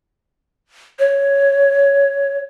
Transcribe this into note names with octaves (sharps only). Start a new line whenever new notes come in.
C#5